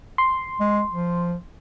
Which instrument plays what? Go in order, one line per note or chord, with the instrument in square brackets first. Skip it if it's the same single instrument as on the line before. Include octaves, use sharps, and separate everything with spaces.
[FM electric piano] C6
[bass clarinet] G#3
F3